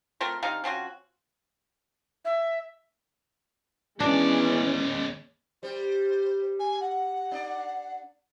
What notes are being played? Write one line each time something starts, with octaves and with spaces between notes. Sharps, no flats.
A3 C4 F4 A#4
C3 D4 D#4 F5
F3 C4 C#4 F#4
E5
D#2 E3 G#3 B3 C#4 D4 D5
G3 C5
G#5
F#5
D4 D5